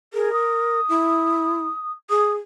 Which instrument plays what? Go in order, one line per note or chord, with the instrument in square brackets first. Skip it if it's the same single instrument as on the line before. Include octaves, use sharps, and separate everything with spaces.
[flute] G#4 [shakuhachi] A#4
[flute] D#6
[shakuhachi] E4
[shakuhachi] G#4 [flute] D#6